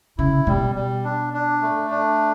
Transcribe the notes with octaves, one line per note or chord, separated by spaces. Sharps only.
C#3 E4
B2 G3
G3
D4
D4
A3
D4